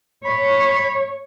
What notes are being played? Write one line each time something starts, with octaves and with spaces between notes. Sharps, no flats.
C#5 B5